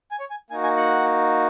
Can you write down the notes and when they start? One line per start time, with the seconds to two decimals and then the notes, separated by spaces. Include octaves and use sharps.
0.11 G#5
0.20 C#5
0.30 G#5
0.50 A#3 D#4 F#4 G#5
0.63 G#5
0.77 F#5